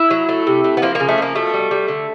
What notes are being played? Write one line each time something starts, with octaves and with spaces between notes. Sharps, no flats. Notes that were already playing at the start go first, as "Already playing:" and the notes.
Already playing: E4
F#3
A3
C3
A3
B3
F3 A#3
C#3 A#3
A3
F3 A#3
B2 A3
G3
G3
D3